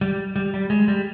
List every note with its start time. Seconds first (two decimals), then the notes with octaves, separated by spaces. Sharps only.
0.01 G3
0.36 G3
0.54 G3
0.70 G#3
0.88 G3